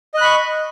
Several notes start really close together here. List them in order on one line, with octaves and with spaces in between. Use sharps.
D#5 F#6 B5 C#6